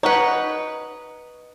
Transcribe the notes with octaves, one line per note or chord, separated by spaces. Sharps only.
D#4 B4 C#5 F#5